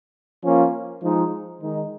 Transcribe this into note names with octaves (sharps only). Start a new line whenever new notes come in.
F3 A#3 C#4 F4
F3 G#3 D#4
D#3 G#3 D#4